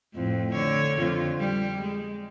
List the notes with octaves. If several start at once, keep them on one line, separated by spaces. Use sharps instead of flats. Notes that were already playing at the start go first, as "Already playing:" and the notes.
F2 A2
D3 C#5
F2 D3 F4
G3
G#3